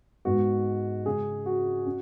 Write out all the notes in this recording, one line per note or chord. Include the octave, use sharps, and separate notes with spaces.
G#2 G#3 B3 F#4
C#3 G#3 C#4 G#4
F#4
C#4